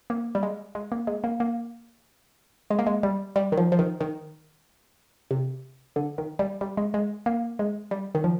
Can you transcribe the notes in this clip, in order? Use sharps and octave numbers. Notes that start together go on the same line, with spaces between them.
A#3
G3
G#3
G#3
A#3
G#3
A#3
A#3
G#3
A#3
G#3
G3
G3
D#3
F3
F3
D#3
D#3
C3
D3
D#3
G3
G3
G#3
G#3
A#3
G#3
G3
D#3
F3